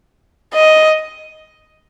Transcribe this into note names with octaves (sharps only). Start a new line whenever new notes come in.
D#5